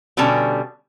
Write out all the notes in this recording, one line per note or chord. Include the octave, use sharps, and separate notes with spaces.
B2 D3 G3 C#4 A5